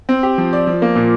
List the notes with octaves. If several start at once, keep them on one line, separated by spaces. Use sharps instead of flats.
C4
G4
F3
D5
F3
A#3
A#2